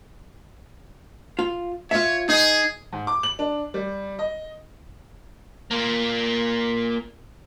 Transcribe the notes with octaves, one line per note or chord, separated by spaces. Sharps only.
F4
F4 C#5 E5
D#4 G#4
G#2
D6
F#7
D4
G3
D#5
A#3 F4